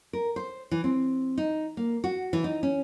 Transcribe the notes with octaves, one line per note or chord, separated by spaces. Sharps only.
A#4
C5
E3
C4
D#4
A#3
F#4
E3
D#4
C#4